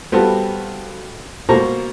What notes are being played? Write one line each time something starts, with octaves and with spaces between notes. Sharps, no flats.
G3 B3 C4 F4 F#4 A4
B2 A#3 F4 C5 A#5 C#6